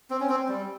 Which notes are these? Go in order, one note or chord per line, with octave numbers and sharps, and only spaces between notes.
C4
C#4
C4
G3